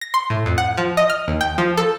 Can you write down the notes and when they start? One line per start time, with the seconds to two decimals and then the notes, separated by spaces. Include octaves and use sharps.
0.01 A#6
0.14 C6
0.30 A2
0.46 F2
0.58 F#5
0.78 F3
0.97 D#5
1.10 F6
1.28 D#2
1.41 G5
1.58 F3
1.77 A4